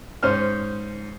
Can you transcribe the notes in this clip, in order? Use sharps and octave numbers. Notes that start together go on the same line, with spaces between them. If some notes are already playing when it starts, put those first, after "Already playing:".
G#2 C#4 C5 F6